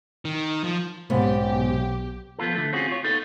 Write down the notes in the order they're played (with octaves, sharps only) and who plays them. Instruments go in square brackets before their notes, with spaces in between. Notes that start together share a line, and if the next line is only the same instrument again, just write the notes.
[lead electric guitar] D#3
F3
[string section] B1 G4 [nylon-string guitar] G#2 C#3 B3
[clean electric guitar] F3 B3 F4 A4
D3 A3
C4 C#4 F4 F#4 G#4
F4 C#5
B3 D#4 A4 F5